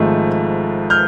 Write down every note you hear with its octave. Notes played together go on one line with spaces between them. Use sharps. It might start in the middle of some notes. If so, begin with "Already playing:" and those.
Already playing: G#1 G#2 F3 A3
F6 G6